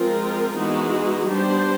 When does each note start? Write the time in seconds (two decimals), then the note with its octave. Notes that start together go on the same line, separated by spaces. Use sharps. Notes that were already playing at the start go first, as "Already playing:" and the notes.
Already playing: F3 G#3 C4 F4 A#4
0.56 E3 G#3 B3 D#4 F#4
1.27 G3 B3 D4 G4 C5